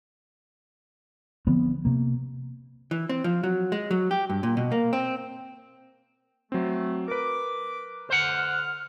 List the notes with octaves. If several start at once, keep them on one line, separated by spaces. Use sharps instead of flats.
D3 F3 B3 C4
C3 A#3
E3
C4
F3
F#3
G#3
F#3
G4
G2
A#2
B2
A#3
C4
F#3 A3 C4
A#4 B4 D6
D3 C5 F#5 F6